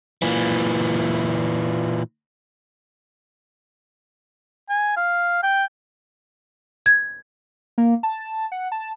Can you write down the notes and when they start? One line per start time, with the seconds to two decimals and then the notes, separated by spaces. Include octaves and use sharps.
0.22 A#2 E3
4.69 G#5
4.96 F5
5.43 G5
6.86 G#6
7.78 A#3
8.03 A5
8.52 F#5
8.72 A5